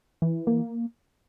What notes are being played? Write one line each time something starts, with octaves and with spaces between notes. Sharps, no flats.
E3
A#3